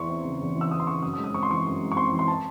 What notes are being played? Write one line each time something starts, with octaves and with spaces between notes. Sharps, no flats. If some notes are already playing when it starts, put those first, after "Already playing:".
Already playing: E2 E3 C6 C#6
C4
C#3
E2
E3
E6
C4 D#6
C6
C#3 C#6
F#2 D#6
D#6
G#3
D#6
C4 C#6
C6
E3 C#6
F#2
G#3
C#6
C4 C6
E3
C6
A5